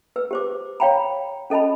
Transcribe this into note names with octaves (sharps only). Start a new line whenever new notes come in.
B4 E6
G4 C5 D6
C#5 F5 G5 A#5 B5
C#4 A4 D#5 A5 B5